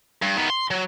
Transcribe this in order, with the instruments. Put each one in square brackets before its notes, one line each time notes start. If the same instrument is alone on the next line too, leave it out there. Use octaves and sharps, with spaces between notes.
[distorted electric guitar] G2
D#3 B3
C6
F#3